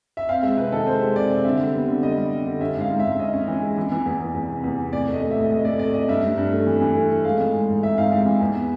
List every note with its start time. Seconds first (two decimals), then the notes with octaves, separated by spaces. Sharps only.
0.17 E5
0.29 C4 F5
0.43 G#3 E5
0.57 C3 B4
0.72 D#3 A4
0.87 G#3 C5
1.01 G#3
1.16 C3 D5
1.30 C4
1.44 D3 E5
1.59 G3
1.74 B3
1.88 D3
2.03 G3 D#5
2.17 G3
2.32 G3
2.47 D3
2.61 C#4 E5
2.75 G#2
2.81 F5
2.90 G#2
3.00 E5
3.05 G#2
3.12 E5
3.19 C#4 D#5
3.33 C#4
3.47 E3
3.62 G#3
3.77 E3
3.92 E3
4.06 E2
4.21 E2
4.34 E2
4.50 C3
4.64 E2
4.79 C3
4.93 A2 D5
5.07 A3
5.13 D#5
5.22 A3
5.31 E5
5.36 A2
5.51 A2 D#5
5.65 A3 D5
5.79 A2 D5
5.94 A2 D#5
6.09 G2 E5
6.23 G2
6.38 G2
6.53 A3
6.67 E3
6.81 E3
6.96 A3
7.10 A3
7.25 G#3 F5
7.40 E3
7.53 G#2
7.68 G#2
7.83 G#2 E5
7.97 G#2 F5
8.11 G#2 F5
8.26 E3
8.41 E2
8.55 B3